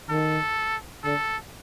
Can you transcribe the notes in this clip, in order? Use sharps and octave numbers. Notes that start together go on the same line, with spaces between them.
D#3 A4
D3 A4